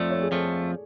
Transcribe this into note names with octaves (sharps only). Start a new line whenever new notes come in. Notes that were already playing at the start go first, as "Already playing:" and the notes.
Already playing: F2 F3 A3 D5
C#5
G#4
F2 F3 A3 A4